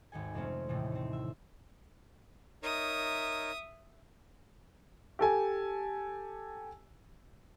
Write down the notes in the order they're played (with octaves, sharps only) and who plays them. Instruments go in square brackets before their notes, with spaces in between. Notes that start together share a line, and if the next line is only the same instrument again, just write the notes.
[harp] G#1 D#2 A4 G#5
F2 C3 G#3 A3 C4 C#4
D#2 A2 C3 E3
A3 C4
E5
[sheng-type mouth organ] D#4 A#4 C#5 [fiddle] E5 D#6
[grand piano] G4 A4 G#5